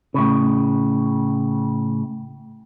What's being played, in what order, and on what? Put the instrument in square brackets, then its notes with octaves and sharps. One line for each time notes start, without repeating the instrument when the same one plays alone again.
[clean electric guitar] A2 C#3